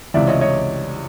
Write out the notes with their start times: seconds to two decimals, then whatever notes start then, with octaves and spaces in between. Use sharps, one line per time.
0.14 C#2 C3 E3 D5 E5
0.28 C#5 D#5
0.41 C#5 D#5